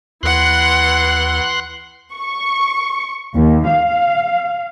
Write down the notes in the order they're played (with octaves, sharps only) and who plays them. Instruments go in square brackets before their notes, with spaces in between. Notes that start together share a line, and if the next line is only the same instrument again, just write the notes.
[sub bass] D#2 [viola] E3 F#5 [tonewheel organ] C6 F#6
[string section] C#6
D#2
F5